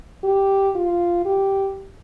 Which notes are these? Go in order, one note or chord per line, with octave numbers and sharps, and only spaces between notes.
G4
F4
G4